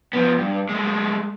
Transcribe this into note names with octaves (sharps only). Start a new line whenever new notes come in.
F3 B3
G2
G#3 A3